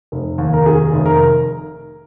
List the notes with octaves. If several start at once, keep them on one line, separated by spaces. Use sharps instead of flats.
F1
D#2
A#4
D#3 G#4
F1
A#4